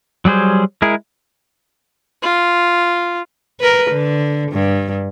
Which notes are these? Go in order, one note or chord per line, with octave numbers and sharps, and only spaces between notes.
F#3 G3 G#4 C5
G#3 E4 G#4 A#4
F4
A#4 B4
D3
G2